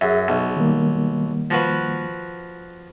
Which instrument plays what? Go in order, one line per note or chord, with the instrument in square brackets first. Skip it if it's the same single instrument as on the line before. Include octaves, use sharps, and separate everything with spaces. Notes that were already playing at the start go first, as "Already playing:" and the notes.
[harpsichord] F#2 [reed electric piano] G#4 E5
[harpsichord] B1
[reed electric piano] D#3 G3 A#3
[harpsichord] F3 F#4 B4